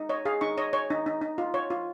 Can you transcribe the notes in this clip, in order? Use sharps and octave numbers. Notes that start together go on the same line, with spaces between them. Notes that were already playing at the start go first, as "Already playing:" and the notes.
Already playing: D#4
C#5 D#5
G#4 F5
D#4 C#6
C#5 D#5
C#5
D#4
D#4
D#4
F4
C#5
F4